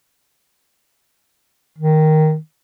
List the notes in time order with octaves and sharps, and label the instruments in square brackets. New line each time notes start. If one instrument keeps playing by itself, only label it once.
[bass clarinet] D#3